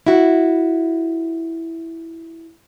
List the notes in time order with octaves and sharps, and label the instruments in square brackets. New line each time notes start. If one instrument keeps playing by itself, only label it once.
[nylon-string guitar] E4 F#4